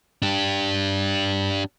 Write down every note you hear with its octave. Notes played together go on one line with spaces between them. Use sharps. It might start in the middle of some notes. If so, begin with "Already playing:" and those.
D4 G4